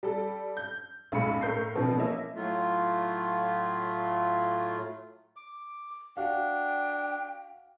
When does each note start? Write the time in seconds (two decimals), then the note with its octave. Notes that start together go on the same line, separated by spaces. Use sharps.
0.03 G3 A4
0.57 G6
1.12 B1 F#2 A2 G#3 B5 C#7
1.41 A2 A#4 G6 C7
1.75 B2 D3 E3 F3 B3 C4
1.97 A#3 C#4 E4 D#5 E5
2.36 A2 F#3 A3 F4
5.36 D6
6.17 D4 F#4 F5 G5